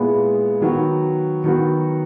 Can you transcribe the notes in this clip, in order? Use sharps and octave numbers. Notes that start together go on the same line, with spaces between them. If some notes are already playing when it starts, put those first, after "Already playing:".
Already playing: A#2 G#3 B3 E4 G#4
D#3 F#3 B3 F#4
D#3 F#3 B3 F#4